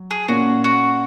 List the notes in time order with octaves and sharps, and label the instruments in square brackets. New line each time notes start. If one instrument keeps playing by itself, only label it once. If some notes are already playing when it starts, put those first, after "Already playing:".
Already playing: [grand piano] F#3
[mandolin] G#4
[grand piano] A#2 A#3 C#4 [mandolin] F#4
[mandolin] F#4